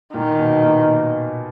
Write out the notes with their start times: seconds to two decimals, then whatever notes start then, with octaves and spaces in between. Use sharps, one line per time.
0.14 A#2 D#3
0.39 B2
0.63 A#2